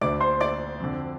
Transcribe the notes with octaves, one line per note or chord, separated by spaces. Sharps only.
D2 D3 D5 D6
C5 C6
D5 D6
F2 D3